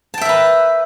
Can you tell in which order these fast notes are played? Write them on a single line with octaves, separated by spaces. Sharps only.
A5 G5 E5 A#4 B4